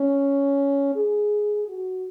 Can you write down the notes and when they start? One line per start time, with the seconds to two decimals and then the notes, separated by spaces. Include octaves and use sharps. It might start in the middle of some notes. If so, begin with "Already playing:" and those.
Already playing: C#4
0.95 G#4
1.68 F#4